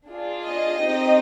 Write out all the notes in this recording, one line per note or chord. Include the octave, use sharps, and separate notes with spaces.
D4 F4 G#4
D#5
C4 D#4 G4